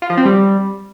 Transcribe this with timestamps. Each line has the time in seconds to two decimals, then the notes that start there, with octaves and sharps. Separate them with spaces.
0.02 F4
0.10 F3
0.17 C4
0.25 G3